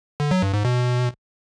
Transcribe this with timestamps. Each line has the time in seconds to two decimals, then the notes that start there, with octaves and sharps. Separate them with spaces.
0.20 D3
0.31 F#3
0.42 G2
0.54 G#2
0.65 B2